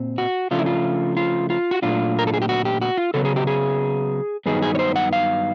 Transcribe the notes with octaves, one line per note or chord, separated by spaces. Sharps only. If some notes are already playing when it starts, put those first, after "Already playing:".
Already playing: A#2 C4
F#4
C#3 F3 A3 D4 F4
E4
F4
F4
F4
F#4
A#2 F#3 A3 D4 F4
A#4
A4
G#4
G4
F#4
G4
F#4
F4
C#3 F#3 B3 A4
G#4
G4
G#4
G2 D#3 F#3 B3 D#4 G#4
G#4
C#5
C5
F#5
F5